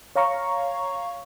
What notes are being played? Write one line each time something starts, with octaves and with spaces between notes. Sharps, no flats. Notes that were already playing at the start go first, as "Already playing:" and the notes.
C#5 F5 A#5 C#6